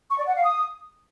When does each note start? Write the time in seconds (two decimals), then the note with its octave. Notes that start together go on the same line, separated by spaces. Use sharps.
0.10 C#6
0.19 D5
0.27 F#5
0.36 F5
0.44 D#6